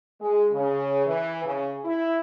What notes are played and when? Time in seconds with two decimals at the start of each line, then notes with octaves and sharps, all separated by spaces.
0.20 G#3
0.52 C#3
1.05 E3
1.44 C#3
1.85 E4